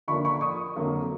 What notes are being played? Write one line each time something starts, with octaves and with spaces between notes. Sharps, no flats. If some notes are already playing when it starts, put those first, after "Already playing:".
D3 F3 A#3 D4 B5 C#6
B5 C#6
C#6 D#6
F2 D3 F#3 A#3